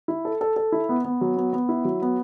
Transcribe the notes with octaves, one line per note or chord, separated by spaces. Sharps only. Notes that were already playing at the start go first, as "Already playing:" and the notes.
E4
A4
A4
A4
E4
B3
B3
F#3
B3
B3
E4
F#3
B3